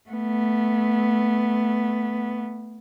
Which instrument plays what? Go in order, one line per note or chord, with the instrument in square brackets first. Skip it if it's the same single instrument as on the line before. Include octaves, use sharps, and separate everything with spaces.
[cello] A3 B3